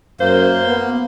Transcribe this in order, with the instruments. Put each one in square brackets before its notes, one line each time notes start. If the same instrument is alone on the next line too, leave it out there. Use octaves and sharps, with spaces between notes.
[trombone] F#2 [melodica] A#3 [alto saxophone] C5
[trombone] B3